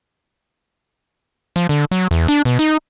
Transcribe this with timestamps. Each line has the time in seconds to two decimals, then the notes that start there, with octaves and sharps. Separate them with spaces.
1.56 F3
1.69 D3
1.91 F#3
2.11 E2
2.28 D4
2.45 B2
2.59 D#4